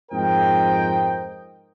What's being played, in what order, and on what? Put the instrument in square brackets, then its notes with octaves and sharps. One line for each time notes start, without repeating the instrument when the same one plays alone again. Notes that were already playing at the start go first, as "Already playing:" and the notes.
[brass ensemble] F2 G#2 A#4 C5 D#5 G5